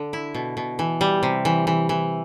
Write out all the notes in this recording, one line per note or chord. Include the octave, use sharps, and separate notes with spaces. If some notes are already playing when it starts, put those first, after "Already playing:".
Already playing: D3
E4
B2
B2
E3
G3
C3
E3
E3
E3